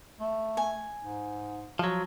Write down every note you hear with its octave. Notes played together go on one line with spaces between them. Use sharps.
A3
G#5
G#2
F3 F#3